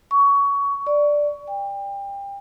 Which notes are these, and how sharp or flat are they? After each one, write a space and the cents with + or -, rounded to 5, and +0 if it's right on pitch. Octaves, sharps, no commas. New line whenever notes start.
C#6 +20
D5 +0
G5 +30